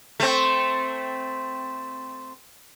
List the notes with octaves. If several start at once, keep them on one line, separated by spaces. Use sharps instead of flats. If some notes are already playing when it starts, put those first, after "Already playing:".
A3 C4